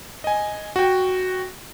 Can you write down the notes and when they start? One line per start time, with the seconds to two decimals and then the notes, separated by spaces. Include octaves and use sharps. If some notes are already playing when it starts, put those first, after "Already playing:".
0.24 D#5 G#5
0.76 F#4 G5